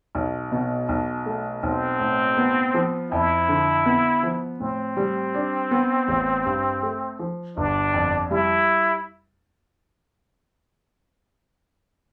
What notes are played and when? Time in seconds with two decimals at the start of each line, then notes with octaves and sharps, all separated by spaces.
0.15 B1
0.52 B2
0.89 B1
1.26 A3
1.63 B1 C4
2.00 A2
2.37 B3
2.74 F3
3.11 F2 E4
3.49 D3
3.86 B3
4.23 F3
4.60 A2 C4
4.97 G3
5.34 D4
5.71 B3
6.08 A1
6.45 G2
6.83 A3
7.19 F3
7.57 G1 D4
7.93 F2
8.31 G3 E4